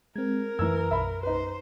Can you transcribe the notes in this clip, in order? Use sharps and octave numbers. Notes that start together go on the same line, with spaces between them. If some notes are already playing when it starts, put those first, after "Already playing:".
G#3 C4 A#4 G#6
F#2 E3 A#5 E6 G#6
B1 E5 B5
D#4 B4 C5